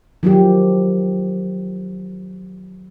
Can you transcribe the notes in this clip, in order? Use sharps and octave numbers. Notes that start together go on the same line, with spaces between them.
D#3 F3 F#3 G4